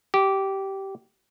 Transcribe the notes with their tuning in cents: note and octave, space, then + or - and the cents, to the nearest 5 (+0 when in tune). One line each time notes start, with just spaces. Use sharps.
G4 -15